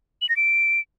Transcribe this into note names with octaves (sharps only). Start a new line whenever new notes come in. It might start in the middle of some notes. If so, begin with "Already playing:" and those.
F#7
A#6
D7